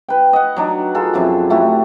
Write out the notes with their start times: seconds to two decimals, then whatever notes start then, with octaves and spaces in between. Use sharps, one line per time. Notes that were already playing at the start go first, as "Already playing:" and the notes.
0.08 B4 G5
0.33 D#5 F#5
0.56 F#3 D4 D#4
0.95 F4 G#4 A4
1.14 F#2 C3 F3 F#3
1.50 A3 E4 F#4 G4